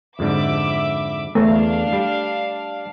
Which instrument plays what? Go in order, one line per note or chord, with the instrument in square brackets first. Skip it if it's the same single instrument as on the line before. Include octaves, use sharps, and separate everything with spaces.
[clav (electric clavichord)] F2 G#2 D3 [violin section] E5 B5 D6
[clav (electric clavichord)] E2 [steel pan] A3 [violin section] D4 F5
[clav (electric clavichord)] G3